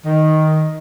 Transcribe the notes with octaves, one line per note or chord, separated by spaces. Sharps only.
D#3